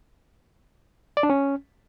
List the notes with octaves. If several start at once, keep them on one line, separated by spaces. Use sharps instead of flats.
D5
D4
C#4